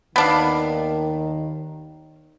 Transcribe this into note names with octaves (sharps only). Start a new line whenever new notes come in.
D#2 D#3 B3 D4 F5